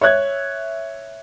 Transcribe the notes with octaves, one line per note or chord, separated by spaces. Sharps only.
C#5 E5 F#6 G#6